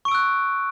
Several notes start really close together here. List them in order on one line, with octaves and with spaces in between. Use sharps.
C#6 D7 E6 F#6